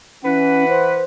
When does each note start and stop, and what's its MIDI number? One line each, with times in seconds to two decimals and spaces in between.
0.24 1.02 52
0.24 0.64 61
0.24 1.02 71
0.24 1.02 78
0.68 1.04 72